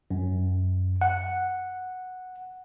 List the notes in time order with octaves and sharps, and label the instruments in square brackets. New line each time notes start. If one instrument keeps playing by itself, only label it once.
[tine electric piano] F#2
F#5